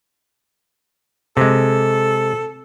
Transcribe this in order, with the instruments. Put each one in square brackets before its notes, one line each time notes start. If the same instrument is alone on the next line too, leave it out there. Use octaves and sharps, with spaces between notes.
[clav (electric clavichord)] C3 G#3 [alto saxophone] A4